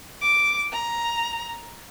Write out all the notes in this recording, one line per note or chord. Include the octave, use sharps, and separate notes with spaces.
D6
A#5